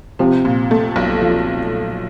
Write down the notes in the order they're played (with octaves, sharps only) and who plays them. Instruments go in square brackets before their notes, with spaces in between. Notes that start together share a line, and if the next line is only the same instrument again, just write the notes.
[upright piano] C3 [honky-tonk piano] F3
[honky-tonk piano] A#2
A3
B1
F3